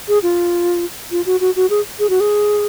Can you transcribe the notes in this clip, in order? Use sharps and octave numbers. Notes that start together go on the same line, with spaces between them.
G#4
F4
F4
F#4
F#4
F#4
G#4
G#4
F#4
G#4